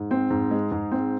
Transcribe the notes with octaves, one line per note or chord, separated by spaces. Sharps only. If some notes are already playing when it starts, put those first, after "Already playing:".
Already playing: G#2
C4
G#2
G#3
G#2
C4